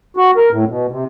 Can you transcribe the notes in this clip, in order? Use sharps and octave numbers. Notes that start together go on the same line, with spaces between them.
F#4
A#4
A2
B2
C3